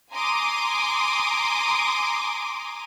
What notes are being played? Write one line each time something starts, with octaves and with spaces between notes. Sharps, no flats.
G#5 A#5 C6 D6 D#6